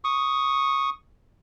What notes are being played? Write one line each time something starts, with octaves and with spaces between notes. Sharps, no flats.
C#6 D#6